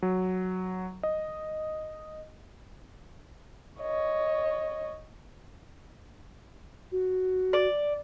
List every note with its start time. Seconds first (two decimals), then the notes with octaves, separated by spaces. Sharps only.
0.02 F#3
1.03 D#5
3.81 C#5 D#5
6.92 F#4
7.53 D5